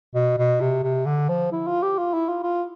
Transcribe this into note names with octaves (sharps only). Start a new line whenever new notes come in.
B2
B2
C3
C3
D3
F3
E4
F4
G4
F4
E4
F4
F4